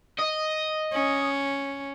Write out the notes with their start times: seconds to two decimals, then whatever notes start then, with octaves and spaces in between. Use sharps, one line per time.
0.19 D#5
0.93 C#4